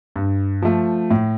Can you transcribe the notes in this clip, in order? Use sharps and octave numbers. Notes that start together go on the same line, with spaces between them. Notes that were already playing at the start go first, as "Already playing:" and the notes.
G2
F3 A3
A2